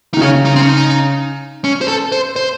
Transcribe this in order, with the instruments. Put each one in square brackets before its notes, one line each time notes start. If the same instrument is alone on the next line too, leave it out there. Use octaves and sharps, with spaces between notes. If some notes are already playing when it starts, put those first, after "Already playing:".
[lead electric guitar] D#4
[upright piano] D#3
[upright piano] C#3 [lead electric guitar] C#4
[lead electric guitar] D#4
C4
C#4
D#4
C#4
C5
A4
C5
C5